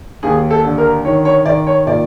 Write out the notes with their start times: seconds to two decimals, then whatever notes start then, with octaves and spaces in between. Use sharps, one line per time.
0.23 D#2 G#4
0.51 A4
0.64 D3
0.78 A#4
1.05 D#3 C#5
1.25 C#5
1.45 D#3 D5
1.67 C#5
1.86 A#2 D5